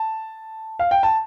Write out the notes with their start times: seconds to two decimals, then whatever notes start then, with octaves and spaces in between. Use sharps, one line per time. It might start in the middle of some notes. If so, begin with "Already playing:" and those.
Already playing: A5
0.79 F5
0.91 G5
1.03 A5